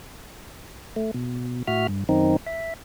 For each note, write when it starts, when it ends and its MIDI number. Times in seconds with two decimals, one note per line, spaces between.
0.96 1.11 57
1.14 1.63 47
1.68 1.87 45
1.68 1.87 66
1.68 1.87 76
1.68 1.87 89
1.88 2.04 43
2.09 2.37 42
2.09 2.37 51
2.09 2.37 60
2.09 2.37 63
2.46 2.74 76